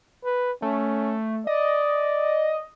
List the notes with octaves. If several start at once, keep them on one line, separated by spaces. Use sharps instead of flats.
B4
A3 C#4
D5 D#5